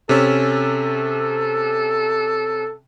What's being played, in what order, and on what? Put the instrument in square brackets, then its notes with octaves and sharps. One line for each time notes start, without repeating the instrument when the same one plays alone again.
[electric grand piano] C3 C#4 [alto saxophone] A4